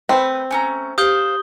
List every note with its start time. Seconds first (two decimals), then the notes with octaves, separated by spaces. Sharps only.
0.09 A3 C4 B4 B5
0.51 A3 C#4 G#5 A#5
0.98 G4 C5 F5 D#6 G6 G7